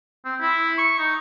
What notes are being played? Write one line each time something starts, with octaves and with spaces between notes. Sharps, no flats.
C4
E4
C#6
D#4